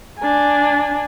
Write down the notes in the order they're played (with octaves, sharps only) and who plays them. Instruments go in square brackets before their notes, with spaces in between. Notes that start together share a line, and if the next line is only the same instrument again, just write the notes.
[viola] D4 G#5